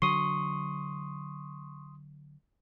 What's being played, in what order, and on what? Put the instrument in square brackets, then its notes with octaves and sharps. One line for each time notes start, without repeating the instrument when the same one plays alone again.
[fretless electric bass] D3 F#3 [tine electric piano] C6 D#6 [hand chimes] C#6